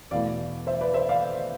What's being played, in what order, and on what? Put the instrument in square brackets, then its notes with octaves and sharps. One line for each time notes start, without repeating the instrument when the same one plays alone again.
[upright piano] E2 B2 A3 E4 D5 F5
C5 E5
B4 D5
C5 E5
D5 F5